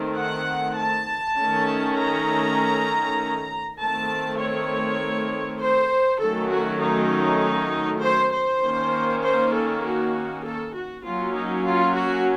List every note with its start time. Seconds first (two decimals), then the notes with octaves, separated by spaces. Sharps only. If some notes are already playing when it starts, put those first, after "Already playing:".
Already playing: D#3 A3 C4
0.18 F#5
0.79 A5
1.38 D#3 A3 C#4
1.99 A#5
3.81 D#3 A3 C4 A5
4.41 C#5
5.61 C5
6.21 D#3 F#3 A3 C#4 A4
6.52 F#4
6.83 D#4
8.02 C5
8.33 C5
8.63 D#3 A#3 C#4
9.23 C5
9.54 A4
9.84 F#4
10.45 A4
10.74 F#4
11.05 F#3 A#3 C#4 F4
11.35 D#4
11.65 F4
11.95 F#4